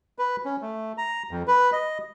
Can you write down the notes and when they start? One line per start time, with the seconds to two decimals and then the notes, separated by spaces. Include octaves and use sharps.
0.19 B4
0.45 C#4
0.62 A3
0.98 A#5
1.31 F2
1.47 B4
1.72 D#5